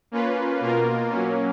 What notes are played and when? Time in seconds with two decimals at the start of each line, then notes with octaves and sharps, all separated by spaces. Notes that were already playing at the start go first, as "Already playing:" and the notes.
0.11 A#3 C#4 F4 B4
0.60 B2 A#3 F4 A#4
1.10 F#3 A#3 C#4